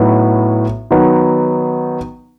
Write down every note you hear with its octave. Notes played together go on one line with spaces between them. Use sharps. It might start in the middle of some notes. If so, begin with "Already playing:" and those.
Already playing: A2 F#3 B3 D#4 F#4
D#3 F#3 B3 D#4